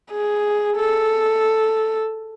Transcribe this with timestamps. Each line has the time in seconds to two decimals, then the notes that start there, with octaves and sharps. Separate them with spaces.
0.11 G#4
0.77 A4